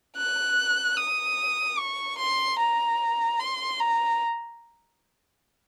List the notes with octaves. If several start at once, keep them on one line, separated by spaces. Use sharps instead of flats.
F#6
D#6
C#6
C6
A#5
C6
A#5